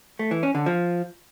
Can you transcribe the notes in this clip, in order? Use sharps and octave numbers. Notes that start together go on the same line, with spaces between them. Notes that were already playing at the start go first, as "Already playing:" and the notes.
A3
E3
C#4
D3
F3